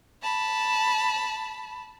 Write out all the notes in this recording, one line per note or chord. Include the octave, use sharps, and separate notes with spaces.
A5 B5